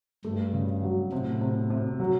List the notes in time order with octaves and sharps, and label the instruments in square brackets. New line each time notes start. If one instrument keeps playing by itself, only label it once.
[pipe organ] G2 [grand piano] A3
[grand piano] C#3
F#3
[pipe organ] A2 [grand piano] C3
[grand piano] C3
C3
F#3